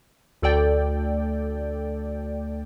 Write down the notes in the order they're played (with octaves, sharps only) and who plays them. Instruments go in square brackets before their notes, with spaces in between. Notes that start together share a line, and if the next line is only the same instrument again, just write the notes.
[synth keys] D2 A4 D5 G5